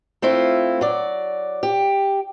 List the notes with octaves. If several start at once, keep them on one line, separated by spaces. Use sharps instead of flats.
A3 C4 E4 F4
F#3 D5
G4